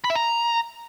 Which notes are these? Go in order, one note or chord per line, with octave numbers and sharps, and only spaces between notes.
B5
E5
A#5